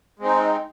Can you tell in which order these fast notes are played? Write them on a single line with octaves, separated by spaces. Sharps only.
G#3 C4 D#4